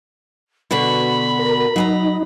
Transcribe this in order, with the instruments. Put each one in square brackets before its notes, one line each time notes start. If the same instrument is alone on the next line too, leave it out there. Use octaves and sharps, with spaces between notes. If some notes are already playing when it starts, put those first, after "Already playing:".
[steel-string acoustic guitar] B2 D3 F#4 [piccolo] B5
[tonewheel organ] A#4
[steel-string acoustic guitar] F#3 G#5 A#5 [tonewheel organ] D#4